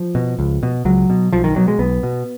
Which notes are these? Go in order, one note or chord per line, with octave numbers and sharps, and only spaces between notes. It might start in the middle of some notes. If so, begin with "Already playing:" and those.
Already playing: F3
B2
C#2
B2
C#2 F#3
B2
B1 F3
D#3
B2 F#3
G#3
B1 B3
B2